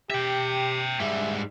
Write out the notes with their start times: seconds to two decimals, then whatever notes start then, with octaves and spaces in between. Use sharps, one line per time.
0.10 G4 E5 G5
1.00 G#2 G3 E5